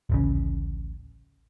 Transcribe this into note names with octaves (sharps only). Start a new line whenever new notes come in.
D1 A1 C#3